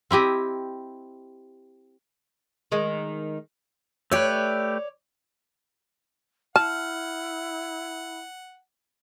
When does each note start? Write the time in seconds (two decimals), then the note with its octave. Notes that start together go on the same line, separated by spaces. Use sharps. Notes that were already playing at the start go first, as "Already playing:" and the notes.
0.11 C4 E4 G4 D#5
2.72 D#3 G#3
4.12 A3 G4 B4 C#5 D5
6.56 E4 F#5 A5 F6